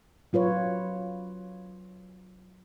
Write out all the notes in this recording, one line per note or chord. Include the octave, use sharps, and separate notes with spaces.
F#3 F4 B4 C#5